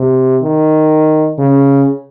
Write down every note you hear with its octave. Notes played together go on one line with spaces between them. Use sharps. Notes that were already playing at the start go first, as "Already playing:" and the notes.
Already playing: C3
D#3
C#3